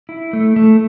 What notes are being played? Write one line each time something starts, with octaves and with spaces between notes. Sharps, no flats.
E4
A3
A3